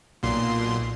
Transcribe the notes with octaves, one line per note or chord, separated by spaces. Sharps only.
B1 A#2 C6